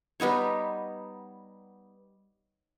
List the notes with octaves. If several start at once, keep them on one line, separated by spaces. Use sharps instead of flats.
G3 B3 D#4 C#5